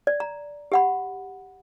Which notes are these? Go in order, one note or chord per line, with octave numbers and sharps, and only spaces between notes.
D5
A#5
G4 F#5 B5